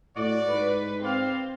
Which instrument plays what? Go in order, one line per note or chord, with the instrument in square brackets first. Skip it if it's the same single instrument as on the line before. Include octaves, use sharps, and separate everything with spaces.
[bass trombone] A2 [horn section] F#4 D5
[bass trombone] G#2 [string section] B4
[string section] C4 [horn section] D5 F5